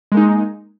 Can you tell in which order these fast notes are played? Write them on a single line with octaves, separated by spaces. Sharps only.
G#3 A#3 D#4